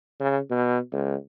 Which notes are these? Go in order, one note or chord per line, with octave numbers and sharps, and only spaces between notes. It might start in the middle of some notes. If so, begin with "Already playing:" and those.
C#3
B2
C#2